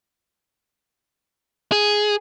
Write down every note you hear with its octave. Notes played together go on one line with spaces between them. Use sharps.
G#4